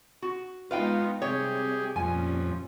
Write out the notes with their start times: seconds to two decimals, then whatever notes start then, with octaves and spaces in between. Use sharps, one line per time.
0.22 F#4
0.71 G#3 B3 D#4 F4 B4 F5 G5
1.22 C3 G3 G4 G#4 C#5
1.96 F2 A#2 G3 C#4 G#5